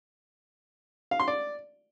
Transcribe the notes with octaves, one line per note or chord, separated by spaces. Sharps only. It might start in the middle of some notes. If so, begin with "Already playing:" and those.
F5
C6
D5